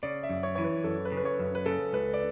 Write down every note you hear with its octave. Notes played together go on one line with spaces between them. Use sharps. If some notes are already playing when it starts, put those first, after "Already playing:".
C#3 D5
E5
F#2
C#5
E3 C#5
B4
F#2 A4
B4
C#3
B4
C#5
F#2
B4
C#3 A4
C#2 B4
D5